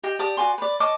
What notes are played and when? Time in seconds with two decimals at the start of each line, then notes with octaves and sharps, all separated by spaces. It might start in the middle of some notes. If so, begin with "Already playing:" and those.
0.03 G4 D#5 G5
0.19 G4 D5 A5 D#6
0.37 F#4 D5 G#5 C6
0.58 B4 D5
0.80 C#5 D#5 A5 D6